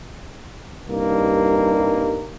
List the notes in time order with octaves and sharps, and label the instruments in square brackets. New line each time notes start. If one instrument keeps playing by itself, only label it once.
[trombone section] C2 G2 A#3 D#4